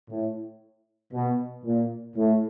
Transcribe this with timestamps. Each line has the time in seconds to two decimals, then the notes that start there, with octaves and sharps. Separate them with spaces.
0.10 A2
1.13 B2
1.65 A#2
2.17 A2